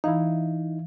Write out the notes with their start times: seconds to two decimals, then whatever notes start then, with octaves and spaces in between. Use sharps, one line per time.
0.04 E3 D#4 E4 F5